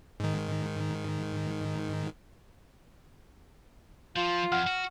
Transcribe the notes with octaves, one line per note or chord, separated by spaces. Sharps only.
G#2 D#3
F3 F4
F2 F#5 F6
F#4